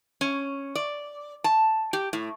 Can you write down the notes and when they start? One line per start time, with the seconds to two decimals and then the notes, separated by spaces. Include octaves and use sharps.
0.21 C#4
0.75 D5
1.44 A5
1.93 G4
2.13 A2